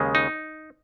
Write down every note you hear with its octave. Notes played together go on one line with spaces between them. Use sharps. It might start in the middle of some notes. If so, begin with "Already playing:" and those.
Already playing: D#2 C#3 G#3
D#4